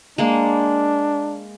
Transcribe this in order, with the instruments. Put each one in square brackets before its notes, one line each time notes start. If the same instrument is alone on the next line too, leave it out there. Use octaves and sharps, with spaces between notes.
[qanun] G#3 A#3 [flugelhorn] D4